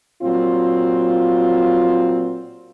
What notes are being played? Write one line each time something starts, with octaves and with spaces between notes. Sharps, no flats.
A#2 F#3 C4 F4